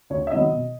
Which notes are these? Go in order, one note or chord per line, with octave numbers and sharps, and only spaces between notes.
D2 C#5
E5
C3 D#3 F#3 B3 D#5
B2